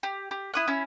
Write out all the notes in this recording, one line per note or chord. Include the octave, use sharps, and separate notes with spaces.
G4
G4
E4 D#6 F#6
C#4 E4